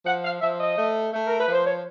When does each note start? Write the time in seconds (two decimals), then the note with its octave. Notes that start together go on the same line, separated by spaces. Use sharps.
0.06 F3 F#5
0.25 F5
0.41 F3 E5
0.60 D#5
0.78 A3
1.14 A3
1.27 A#4
1.40 B4
1.48 F3 C5
1.66 C#5